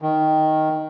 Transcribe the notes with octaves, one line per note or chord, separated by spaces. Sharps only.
D#3